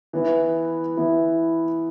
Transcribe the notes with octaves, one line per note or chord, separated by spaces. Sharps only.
E3 B3 E4
E3 B3 E4